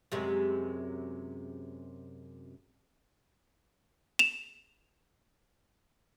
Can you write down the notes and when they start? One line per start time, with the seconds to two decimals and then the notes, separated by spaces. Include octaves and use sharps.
0.12 F#2 C3 G#3
4.19 E7 F7